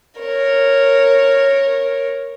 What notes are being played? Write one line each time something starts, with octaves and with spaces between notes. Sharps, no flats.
A#4 C#5